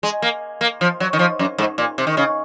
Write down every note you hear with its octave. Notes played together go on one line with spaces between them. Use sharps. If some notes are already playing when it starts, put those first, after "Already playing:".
G#3
A#3
A#3
F3
F#3
D#3
F3
F#2
G#2
A#2
C3
D#3
C#3